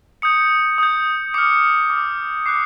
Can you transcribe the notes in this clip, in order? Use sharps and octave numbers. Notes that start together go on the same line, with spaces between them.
D#6 G6 C#7
D#6 G6
D6 F6 C#7
D6 F6
D6 F#6 C7